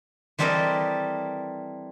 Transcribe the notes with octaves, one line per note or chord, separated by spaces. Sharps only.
E3 G3 C4 A4 A#4 D#5